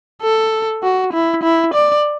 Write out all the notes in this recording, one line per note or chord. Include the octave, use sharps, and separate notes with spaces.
A4
F#4
E4
E4
D5